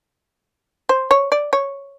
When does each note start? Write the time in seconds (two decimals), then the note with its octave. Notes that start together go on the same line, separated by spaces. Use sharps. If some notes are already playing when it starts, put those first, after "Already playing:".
0.89 C5
1.11 C#5
1.32 D5
1.53 C#5